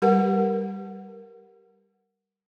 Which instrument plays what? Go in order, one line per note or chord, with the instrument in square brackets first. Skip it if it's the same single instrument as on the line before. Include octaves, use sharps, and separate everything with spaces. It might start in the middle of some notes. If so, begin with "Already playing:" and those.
[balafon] G3 G4 A#4 B4 F#5